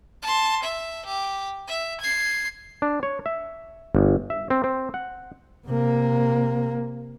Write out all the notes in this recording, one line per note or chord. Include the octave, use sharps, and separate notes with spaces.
A5 C6
E5
G4
E5
G#6 C7
D4
C#5
E5
G1
E5
C4
C4
F#5
C3 A#3